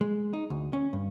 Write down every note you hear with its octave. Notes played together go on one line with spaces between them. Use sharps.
G#3
D#4
D2
C#4
G2